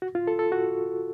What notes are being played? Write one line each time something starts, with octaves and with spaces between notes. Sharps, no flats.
F#4
F4
A4
A4
F#4